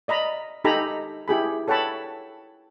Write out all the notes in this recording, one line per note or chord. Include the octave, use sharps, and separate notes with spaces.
D5 D#5 A#5 B5
D#4 G4 A4 G#5 A#5 B5
E4 G4 G#4 B5
A4 C#5 F#5 G5 A5 B5